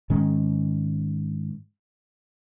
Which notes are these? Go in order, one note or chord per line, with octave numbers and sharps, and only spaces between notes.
G#2 D#3 G#3 C#4